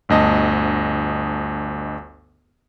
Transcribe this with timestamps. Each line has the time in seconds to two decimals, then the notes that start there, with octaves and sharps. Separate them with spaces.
0.09 G1 D2 D#5 A5